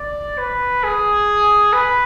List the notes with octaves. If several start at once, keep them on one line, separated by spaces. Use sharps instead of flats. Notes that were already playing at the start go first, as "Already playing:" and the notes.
Already playing: D5
B4
G#4
B4